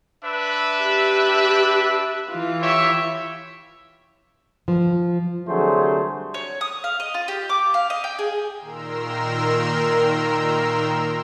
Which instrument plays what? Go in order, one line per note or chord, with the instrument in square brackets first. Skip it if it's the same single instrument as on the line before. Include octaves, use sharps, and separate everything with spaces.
[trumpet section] D4 B4 E5
[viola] G4
E3 F4
[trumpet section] G4 C#5 E5
[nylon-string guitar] F3
[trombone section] C2 D3 F#3 A3 G#4 C5
[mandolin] C#5
D#6
F5
D#5
F4
G4
D6
F5
D#5
G5
G#4
[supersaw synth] A#2 D#3 A#4 A#5 C6 E6